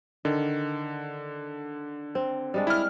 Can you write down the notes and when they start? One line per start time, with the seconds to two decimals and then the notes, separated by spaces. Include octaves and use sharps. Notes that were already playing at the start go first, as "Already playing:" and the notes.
0.25 D3 D#3
2.15 C4
2.54 G3 G#3 D4
2.67 E4 F6